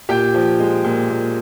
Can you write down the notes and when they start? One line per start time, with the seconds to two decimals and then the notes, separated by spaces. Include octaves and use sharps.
0.09 A#2 G4 G5
0.34 F3
0.60 G#3
0.84 A#2
1.10 A#2